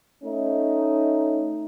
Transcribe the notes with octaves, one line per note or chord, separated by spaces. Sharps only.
A3 C#4 D#4